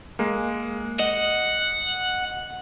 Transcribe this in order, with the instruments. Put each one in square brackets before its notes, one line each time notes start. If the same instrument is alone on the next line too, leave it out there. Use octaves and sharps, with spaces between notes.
[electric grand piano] G#3 A#3
[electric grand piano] D#5 [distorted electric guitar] F#5